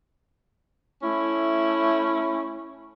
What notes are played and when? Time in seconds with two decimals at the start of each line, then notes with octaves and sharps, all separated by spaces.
1.02 A3 C#4 E4